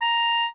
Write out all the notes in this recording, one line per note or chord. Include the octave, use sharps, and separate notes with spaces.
A#5